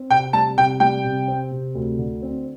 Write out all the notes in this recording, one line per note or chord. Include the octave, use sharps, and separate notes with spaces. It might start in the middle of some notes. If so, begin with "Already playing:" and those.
Already playing: C4
C3 G5
G3 A5
C3 G5
G3 G5
C3
C4
C3
D2
D3
C4